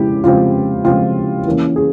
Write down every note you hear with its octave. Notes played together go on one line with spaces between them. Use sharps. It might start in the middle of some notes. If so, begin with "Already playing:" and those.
Already playing: C#3 F3 G#3 C4 E4 G4
C#3 F3 G#3 C4 F4
C#3 F3 G#3 C4 F4
E3 A#3 C#4
G#4